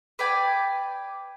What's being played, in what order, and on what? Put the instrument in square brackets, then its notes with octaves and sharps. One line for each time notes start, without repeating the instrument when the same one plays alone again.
[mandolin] B4 D5 G5 G#5